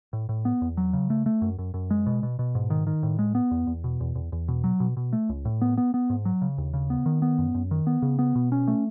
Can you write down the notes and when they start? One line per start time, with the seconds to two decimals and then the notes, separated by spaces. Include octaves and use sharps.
0.13 A2
0.29 A2
0.45 B3
0.62 E2
0.77 F#3
0.93 C#3
1.10 A3
1.26 A3
1.42 F#2
1.59 F#2
1.74 F#2
1.91 G#3
2.06 B2
2.23 B2
2.39 B2
2.55 G#2
2.70 D#3
2.87 D#3
3.03 A2
3.19 G#3
3.35 B3
3.51 E2
3.67 E2
3.84 B2
4.00 E2
4.15 E2
4.32 E2
4.48 B2
4.64 F#3
4.80 B2
4.97 B2
5.13 A3
5.29 C#2
5.45 A2
5.61 B3
5.77 B3
5.94 B3
6.10 G#2
6.25 F#3
6.42 C#3
6.58 D#2
6.74 C#3
6.90 B3
7.06 D#3
7.22 B3
7.38 F#2
7.55 F#2
7.71 D#3
7.87 B3
8.02 C#3
8.19 B3
8.35 B2
8.52 C#4
8.68 A3